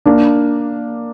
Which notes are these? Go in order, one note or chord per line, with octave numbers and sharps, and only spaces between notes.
A#3 D4